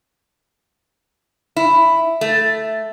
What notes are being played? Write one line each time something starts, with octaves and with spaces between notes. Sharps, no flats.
E4
A3